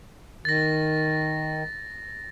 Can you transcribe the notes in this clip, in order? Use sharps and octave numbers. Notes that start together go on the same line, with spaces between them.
D#3 A6 A#6